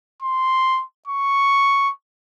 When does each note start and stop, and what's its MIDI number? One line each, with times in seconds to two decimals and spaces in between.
0.23 0.83 84
1.08 1.91 85